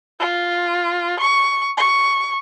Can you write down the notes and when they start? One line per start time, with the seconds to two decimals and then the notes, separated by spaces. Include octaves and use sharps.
0.19 F4
1.19 C#6
1.77 C#6